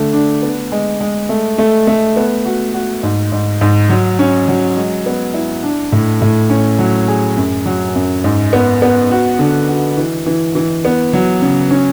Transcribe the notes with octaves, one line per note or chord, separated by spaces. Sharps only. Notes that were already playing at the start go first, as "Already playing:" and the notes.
Already playing: D3 A3
D4
B3
G#3
G#3
A3
A3
A3
B3
F#4
F#4
G#2
G#2
G#2
F#3
C#4
F#3
G#3
B3
E4
D4
A2
A2
C#4
F#3
G#4
F#2
F#3
F#2
G#2
B3
B3
F#4
D3
F#4
E3
E3
E3
B3
F#3
C#3
C#4